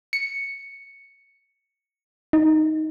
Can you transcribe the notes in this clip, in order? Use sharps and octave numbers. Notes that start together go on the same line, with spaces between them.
C#7
D#4